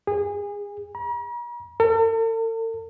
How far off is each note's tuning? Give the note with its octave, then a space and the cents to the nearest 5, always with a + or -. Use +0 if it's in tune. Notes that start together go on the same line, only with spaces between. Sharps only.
G#4 -30
A#5 +45
A4 +45